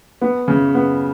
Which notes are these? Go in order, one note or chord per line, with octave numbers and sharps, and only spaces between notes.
B3
C#3
B3